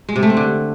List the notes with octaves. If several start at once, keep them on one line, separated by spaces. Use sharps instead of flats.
G#3
C3
A3
C4
D3